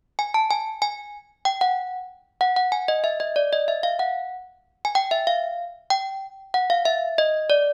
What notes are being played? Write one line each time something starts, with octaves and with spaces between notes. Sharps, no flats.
G#5
A5
G#5
G#5
G5
F#5
F#5
F#5
G#5
D#5
E5
D#5
D5
D#5
E5
F5
F#5
G#5
G5
E5
F5
G5
F#5
F5
E5
D#5
D5